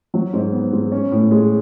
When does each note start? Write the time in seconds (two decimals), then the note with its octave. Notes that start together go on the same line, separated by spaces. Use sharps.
0.14 F#3
0.33 G#2
0.53 B3
0.73 G#2
0.92 C#4
1.11 A2
1.31 G#3